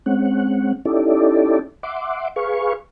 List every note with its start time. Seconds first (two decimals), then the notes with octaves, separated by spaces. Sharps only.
0.06 G#3 C4 C#4 F#5
0.85 C#4 D#4 E4 G4 A4 D5
1.83 E5 F#5 C6 D6
2.36 G#4 B4 F5 C#6